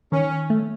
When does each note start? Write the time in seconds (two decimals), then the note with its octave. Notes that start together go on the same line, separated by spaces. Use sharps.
0.12 D#3 C#4
0.50 A3